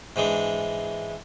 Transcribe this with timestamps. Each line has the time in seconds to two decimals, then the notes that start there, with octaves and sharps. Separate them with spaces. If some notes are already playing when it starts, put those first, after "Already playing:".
0.16 G#2 E3 G#3 D4